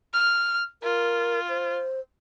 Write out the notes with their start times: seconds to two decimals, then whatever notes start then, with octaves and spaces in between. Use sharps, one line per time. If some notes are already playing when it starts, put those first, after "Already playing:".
0.13 F6
0.83 F4 A#4
1.49 C5